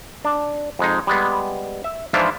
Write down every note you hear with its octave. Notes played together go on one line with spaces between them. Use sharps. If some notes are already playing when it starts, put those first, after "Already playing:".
D4
F2 G#3 D#4
G3 G#3 B3
E5
G#2 E3 F3 D4 E4 F4